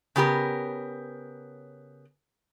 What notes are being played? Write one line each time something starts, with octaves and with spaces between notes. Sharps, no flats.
C#3 B3 G4 A#4